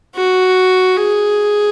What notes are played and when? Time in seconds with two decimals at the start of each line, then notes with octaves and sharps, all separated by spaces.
0.16 F#4
0.96 G#4